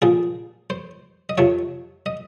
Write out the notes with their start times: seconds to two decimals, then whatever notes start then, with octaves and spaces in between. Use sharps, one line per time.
0.02 A#2 F3 G#4
0.70 C5
1.29 D#5
1.38 F2 C3 F3 C#5
2.06 D#5